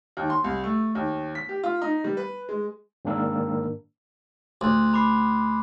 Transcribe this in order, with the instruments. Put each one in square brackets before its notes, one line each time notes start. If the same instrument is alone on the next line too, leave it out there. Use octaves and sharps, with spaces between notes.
[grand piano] D#2
C6
C2
A3
D#2
B6
G4
F4
D#4
G3
B4
G#3
[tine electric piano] G#2 D#3 A#3 D4 A#4 E6
[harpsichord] D2 [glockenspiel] C6 F#6
[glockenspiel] B5 D6 C7